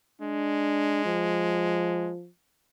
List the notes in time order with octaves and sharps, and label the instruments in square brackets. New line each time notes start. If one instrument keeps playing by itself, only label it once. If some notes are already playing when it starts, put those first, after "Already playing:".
[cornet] G#3 [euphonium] D4
[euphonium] F3